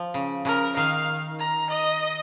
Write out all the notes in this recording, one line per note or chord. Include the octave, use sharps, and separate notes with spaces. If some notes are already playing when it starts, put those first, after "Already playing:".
Already playing: F3
C#3
C#3 A#4
D#3 F5
A#5
D#5